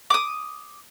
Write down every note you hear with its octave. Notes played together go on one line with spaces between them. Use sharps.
D6 D#6